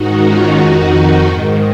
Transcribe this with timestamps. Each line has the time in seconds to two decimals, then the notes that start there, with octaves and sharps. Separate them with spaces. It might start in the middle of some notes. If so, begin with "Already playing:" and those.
Already playing: G#2 D#3 D#4 F#4
0.21 C#4 F4
0.55 F2 D#3 D#4 F#4
1.25 G#2 D#3